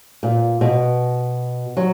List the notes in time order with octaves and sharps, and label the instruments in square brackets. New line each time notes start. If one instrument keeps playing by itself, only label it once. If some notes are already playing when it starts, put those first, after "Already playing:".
[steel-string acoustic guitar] A#2
B2
F#3